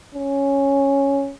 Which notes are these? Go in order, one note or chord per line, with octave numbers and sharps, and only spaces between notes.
C#4